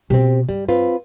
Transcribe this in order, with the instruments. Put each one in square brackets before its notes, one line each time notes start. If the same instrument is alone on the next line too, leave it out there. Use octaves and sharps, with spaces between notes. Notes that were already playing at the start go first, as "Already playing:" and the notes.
[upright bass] B2 F4 [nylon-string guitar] C4 G4
[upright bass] G2 [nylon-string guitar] G3
[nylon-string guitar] C4 F4 B4